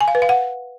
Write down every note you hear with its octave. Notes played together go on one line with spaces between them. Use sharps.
G#5
F5
B4
F5
F#5